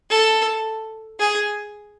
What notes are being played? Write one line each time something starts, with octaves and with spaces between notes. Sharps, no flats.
A4
G#4